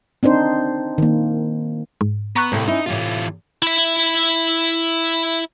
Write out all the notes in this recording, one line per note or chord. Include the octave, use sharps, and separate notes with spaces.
C4 D4 D#4 C5
D#3 A#3
G#2
B3 A#5 C#6 F#6
C2 A2 A3 C4
C#4 D#4 E4
A2 C3 E3 F4
E4 E5